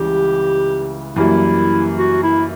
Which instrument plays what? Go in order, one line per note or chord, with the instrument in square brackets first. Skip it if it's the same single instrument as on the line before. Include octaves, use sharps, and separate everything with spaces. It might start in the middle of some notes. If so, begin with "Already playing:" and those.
Already playing: [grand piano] C#2 C#3 E3 G3 [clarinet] G4
[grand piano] F#2 E3 G3 A#3 [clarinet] E4
[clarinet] F#4
E4